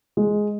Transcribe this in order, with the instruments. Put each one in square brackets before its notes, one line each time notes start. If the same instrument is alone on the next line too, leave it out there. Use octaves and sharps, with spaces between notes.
[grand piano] G#3